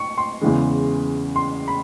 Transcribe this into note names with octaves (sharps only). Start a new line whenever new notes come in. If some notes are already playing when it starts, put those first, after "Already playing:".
Already playing: C#6
C6
E2 C#3 E3 G#3
C6
B5